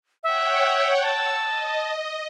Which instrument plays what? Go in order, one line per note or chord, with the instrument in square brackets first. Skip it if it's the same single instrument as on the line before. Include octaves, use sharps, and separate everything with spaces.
[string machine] C#5 F#5 G5 [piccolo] E5
[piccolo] A5 [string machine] E6
[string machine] D#5